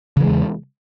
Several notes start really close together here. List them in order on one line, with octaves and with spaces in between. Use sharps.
C#3 E3 G#3 E2